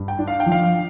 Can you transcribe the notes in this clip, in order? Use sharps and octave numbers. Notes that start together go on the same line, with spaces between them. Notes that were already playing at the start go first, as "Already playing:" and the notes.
Already playing: G2
G5
D4
F5
G5
F3
F5